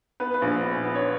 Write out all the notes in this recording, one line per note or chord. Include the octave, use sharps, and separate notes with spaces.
B3 B4
B4
A#1
B3
B3
C#5